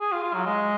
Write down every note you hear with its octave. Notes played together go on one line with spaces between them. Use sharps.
G#4
F4
F4
F#3
G#3